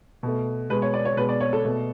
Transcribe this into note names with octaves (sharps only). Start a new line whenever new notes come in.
B2 A3
B2 G#3 B4
C#5
D5
C#5
B2 G#3 B4
D5
C#5
A4
B2 A3